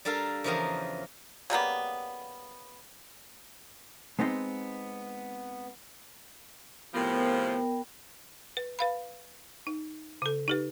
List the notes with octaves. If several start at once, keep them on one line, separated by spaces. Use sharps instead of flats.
G3 D4 A4 A#4 F5
E2 C#3 F3 A#4 D#5 G5
C#3 G3 A#3 B3
G#3 B3 C4 D#4
A2 C3 F3 B3 A#4 G5
B4
B4 F5 B5
D#4
C#3 A4
D#4 G4 B4